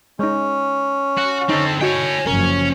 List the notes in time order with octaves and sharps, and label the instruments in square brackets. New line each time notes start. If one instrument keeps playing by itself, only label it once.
[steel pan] G#3 D#4 [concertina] C#4
[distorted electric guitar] F#4
[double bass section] D3 [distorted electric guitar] C4 A4 [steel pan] D#4
[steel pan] F#4 D#5 [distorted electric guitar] C#5 G5 [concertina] G#5
[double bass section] F#1 F#2 F3 [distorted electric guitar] C#4 C#5 [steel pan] A#4